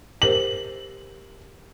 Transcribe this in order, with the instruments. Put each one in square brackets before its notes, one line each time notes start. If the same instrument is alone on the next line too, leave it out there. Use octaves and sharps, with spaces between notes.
[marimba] G4 A#4 C5 [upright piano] F#7